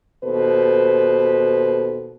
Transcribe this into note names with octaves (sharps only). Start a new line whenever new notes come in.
D#2 B2 A4 B4 C5